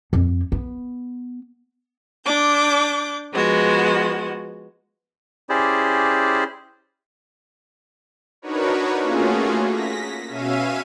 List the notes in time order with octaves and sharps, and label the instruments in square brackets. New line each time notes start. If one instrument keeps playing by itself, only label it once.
[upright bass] F2
B3
[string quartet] D4 D6 G6
F3 G#3 B3 F#4
[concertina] C#4 E4 G4 G#4 C5 D5
[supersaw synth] D4 D#4 F#4 A#4 B4 C#5
A3 A#3 C#4 F4 F#4 G#4
A#6 B6
B2 C#4 E5 F5 D#7